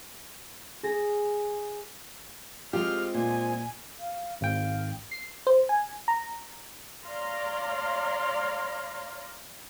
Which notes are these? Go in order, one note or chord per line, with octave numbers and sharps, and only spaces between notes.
G#4 A#6
G#3 C4 F4 G4 F6
A#2 G#5
F5
G#1 F5 G5
C7
C5
G#5
A#5
C#5 D5 F5 A#5 C6